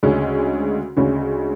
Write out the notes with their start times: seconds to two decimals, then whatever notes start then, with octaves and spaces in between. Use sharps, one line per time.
0.03 D2 C#3 G#3 C#4
0.97 D2 C#3 G#3 C#4